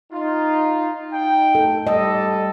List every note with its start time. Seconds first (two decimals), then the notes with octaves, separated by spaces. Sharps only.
0.12 D#4 F4
1.12 D#4 G5
1.55 A4
1.87 G3 A4 D#5